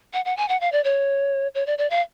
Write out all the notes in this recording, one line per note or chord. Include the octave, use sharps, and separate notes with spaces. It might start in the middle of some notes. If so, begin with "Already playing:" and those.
F#5
F#5
G#5
F#5
F5
D5
C#5
C#5
D5
D5
F5